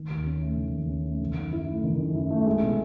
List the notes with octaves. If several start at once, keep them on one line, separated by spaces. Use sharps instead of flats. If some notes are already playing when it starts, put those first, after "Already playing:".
Already playing: D#3
D#2
C#4
A3
D#3
D#2
C#4
A3
D#3
F#2
E4
A3
D#3
F#2
E4
A3
G#3
B2